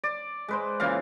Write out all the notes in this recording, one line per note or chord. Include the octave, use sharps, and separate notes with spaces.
D5
G#3 B4 C5
A#2 C#3 E3 F5